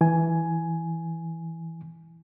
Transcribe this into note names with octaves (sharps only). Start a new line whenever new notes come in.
E3 G#5